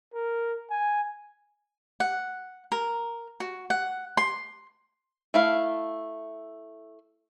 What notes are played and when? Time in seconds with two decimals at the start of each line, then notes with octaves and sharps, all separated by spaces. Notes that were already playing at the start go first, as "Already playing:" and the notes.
0.14 A#4
0.70 G#5
2.00 F#5
2.72 A#4
3.40 F#4
3.70 F#5
4.17 C6
5.34 A3 E4 F5